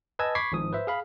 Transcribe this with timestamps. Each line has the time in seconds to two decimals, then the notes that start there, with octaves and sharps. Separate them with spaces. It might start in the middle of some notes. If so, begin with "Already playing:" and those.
0.19 B4 D#5 G#5 A5 E6 G#6
0.35 B5 C#6 D6 G#6 B6 C7
0.52 G#1 G#2 F3 D#6
0.73 B4 C5 E5
0.87 G#4 F5 B5